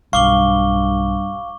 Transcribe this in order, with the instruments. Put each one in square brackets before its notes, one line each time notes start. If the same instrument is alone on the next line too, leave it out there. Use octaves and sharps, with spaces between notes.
[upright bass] B1 [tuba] G2 [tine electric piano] F5 [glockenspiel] C#6 D6 G7